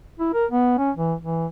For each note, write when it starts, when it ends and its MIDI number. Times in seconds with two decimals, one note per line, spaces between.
0.19 0.31 64
0.34 0.45 70
0.51 0.77 59
0.78 0.91 61
0.97 1.14 52
1.23 1.46 52